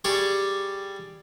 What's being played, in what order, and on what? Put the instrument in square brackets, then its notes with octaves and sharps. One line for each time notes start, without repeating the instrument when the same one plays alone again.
[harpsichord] G3 G4 G#4 C#6